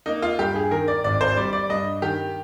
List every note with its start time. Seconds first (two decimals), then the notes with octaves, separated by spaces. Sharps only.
0.06 A#3 D#4
0.22 F4
0.39 G2 G4
0.56 G#4
0.71 D#3 A#4
0.88 D5
1.04 G#1 D5
1.21 C5
1.37 G3 D5
1.53 D5
1.69 G2 D#5
2.02 D#3 G4